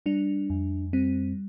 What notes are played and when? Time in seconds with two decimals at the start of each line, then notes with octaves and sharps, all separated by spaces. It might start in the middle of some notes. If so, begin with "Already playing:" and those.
0.06 G3 D4
0.50 F2
0.93 G3 C4